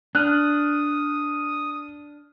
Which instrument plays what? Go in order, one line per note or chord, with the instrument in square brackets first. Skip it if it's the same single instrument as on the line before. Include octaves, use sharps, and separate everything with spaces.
[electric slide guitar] D4 [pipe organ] D#6 [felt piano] F6 F#6